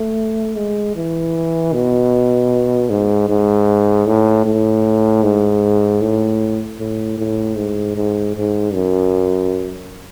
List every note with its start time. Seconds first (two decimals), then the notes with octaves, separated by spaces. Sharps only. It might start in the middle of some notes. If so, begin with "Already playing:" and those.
Already playing: A3
0.57 G#3
0.96 E3
1.73 B2
2.90 G#2
3.28 G#2
4.07 A2
4.46 A2
5.23 G#2
6.02 A2
6.79 A2
7.18 A2
7.57 G#2
7.96 G#2
8.35 G#2
8.74 F#2